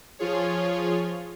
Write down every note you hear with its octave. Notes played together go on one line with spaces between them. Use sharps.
F3 F4 G#4 C#5